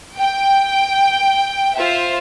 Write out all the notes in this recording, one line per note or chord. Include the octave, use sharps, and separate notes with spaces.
G5
F4 C5 E5